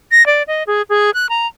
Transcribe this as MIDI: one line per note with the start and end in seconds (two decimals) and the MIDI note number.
0.11 0.26 94
0.26 0.43 74
0.48 0.63 75
0.67 0.82 68
0.89 1.10 68
1.14 1.27 90
1.29 1.47 82